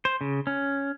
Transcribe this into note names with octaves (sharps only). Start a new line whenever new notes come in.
C5
C#3
C#4